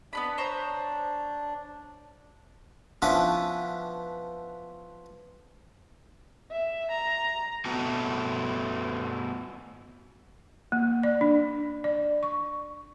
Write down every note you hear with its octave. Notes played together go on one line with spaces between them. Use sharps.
B3 D4 B4 B5
C5 C#5 A#5
F3 B3 C#4 D4 E4 B4
E5
A#5
A3 B3 F#4 A5
A#3
D5
D4
D5
C#6